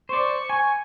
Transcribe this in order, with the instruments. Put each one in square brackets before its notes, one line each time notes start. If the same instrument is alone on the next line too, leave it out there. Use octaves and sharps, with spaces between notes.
[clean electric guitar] C5 D5 [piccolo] C#6
[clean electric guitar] G#5